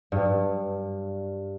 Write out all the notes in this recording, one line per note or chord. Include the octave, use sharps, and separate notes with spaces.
G2